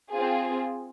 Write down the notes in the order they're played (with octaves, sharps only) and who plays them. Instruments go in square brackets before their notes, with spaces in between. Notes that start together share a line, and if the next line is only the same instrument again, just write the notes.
[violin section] C4 F4 G#4